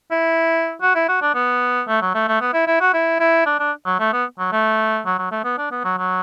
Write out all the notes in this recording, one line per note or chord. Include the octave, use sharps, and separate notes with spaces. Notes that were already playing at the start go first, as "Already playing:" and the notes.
E4
F#4
E4
F#4
D4
B3
A3
F#3
A3
A3
B3
E4
E4
F#4
E4
E4
D4
D4
F#3
A3
B3
F#3
A3
F#3
F#3
A3
B3
D4
B3
F#3
F#3